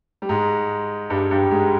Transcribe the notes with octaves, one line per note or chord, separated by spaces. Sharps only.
G3
G#2 G#3
G2 G3
G2 G3
G#2 G#3